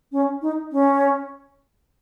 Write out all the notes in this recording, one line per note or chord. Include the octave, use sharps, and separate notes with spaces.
C#4
D#4
C#4